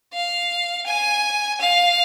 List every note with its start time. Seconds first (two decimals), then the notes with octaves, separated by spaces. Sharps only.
0.13 F5
0.86 G#5
1.61 F5